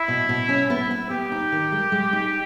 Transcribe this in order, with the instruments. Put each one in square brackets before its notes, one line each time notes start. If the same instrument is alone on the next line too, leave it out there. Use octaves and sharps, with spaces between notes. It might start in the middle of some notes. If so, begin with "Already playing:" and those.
Already playing: [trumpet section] E4
[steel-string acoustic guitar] B2
B2
C#4
[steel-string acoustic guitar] B3 [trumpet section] E4
[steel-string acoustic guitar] B3
[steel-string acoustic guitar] B3 [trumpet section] G4
[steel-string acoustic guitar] D#4
D#3
G#3
G#3
D#4